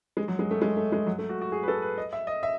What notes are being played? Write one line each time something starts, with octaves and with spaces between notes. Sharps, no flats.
G#3
F#3
G#3
A3
G#3
A3
G#3
F#3
A3
F#4
F#4
G#4
B4
A4
B4
D#5
E5
D#5
E5